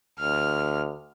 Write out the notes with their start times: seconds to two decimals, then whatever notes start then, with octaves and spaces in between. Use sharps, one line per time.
0.20 D2 F6